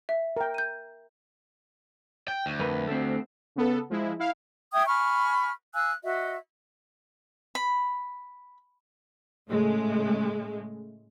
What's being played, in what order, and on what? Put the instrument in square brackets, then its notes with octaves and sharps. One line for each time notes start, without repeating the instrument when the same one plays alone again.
[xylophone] E5
[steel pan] A#4 G5
[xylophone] G6 D#7
[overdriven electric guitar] G5
D2
[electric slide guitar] F2 A#4 B4
A3 B3 C4
[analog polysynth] C#3 B3 A4
F3 G#3 E4
E4 F5
[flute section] E5 G5 D#6 G#6
G#5 B5 C#6 F6
F5 G#5 E6 F#6
F#4 D#5 E5
[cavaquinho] B5
[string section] A2 C#3 G#3 A3